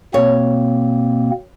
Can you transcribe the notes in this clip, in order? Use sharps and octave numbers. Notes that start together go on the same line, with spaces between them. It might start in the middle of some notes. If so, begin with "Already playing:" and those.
B2 A#3 C4 C#5